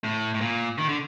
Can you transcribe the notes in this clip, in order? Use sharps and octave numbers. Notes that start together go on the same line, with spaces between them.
A2
A2
A#2
D#3
D3